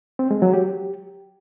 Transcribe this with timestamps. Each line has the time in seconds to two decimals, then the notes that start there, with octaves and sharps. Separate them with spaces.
0.19 C4
0.31 G#3
0.42 F#3
0.53 G4